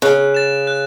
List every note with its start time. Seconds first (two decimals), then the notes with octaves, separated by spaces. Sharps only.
0.02 C#3 F#6
0.34 A6 E7
0.67 F#6